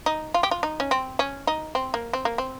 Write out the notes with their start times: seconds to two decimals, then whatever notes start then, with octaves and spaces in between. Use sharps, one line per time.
0.06 D#4
0.34 F4
0.43 G4
0.51 F4
0.63 D#4
0.80 C#4
0.91 C4
1.19 C#4
1.47 D#4
1.75 C4
1.94 A#3
2.13 C4
2.25 A#3
2.38 C4